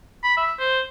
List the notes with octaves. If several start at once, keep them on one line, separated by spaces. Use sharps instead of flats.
B5
E5
C5